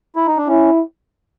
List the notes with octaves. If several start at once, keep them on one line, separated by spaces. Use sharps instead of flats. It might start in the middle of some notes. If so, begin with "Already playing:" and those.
E4
D#4
D4
C#4 E4